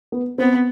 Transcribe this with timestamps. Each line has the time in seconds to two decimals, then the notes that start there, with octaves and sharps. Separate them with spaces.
0.12 B3
0.38 B3 C4